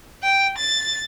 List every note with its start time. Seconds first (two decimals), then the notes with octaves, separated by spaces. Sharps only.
0.23 G5
0.58 A6